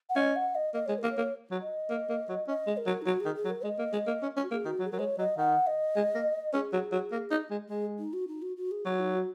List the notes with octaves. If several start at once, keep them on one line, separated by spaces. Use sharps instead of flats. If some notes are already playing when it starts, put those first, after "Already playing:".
F#5
C#4 D#5
F#5
D#5
A#3 D#5
G#3 C#5
A#4
A#3
C#5
A#3
F#3
D#5
A#3
A#3
F#3
C#4 D#5
G#3
A#4
F#3
D#4
F#3 F#4
G#4
D#3
G#4
F#3
A#4
G#3 D#5
A#3
G#3
A#3
C#4
C#4
F#4
A#3 G#4
D#3 F#4
F#3
G#4
F#3 A#4
G#3 C#5
F#3 D#5
D#3 F#5
D#5
G#3
A#3
C#4 G#4
F#3
F#3
A#3
D#4
G#3
G#3 G#4
D#4
F#4
D#4
F#4
F#4
G#4
F#3 F#4
D#4
F#4